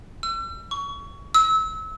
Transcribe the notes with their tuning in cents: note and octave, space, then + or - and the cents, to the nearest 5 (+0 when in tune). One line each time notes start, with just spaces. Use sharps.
E6 +40
C#6 +25
E6 -25